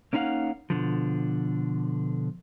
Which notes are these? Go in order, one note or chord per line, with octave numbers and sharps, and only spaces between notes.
A#3 C#4 D#4 B4 F5 F#5
B2 D3 F3